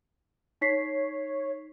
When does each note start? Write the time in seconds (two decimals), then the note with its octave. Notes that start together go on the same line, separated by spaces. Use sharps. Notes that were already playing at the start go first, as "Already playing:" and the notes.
0.61 D#4 C#5 B6 C7